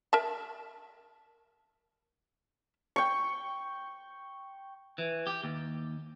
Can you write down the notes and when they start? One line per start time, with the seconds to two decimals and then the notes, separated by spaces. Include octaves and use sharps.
0.13 A#4 E5 A5
2.96 G5 C#6
4.98 E3
5.27 G4
5.44 D#2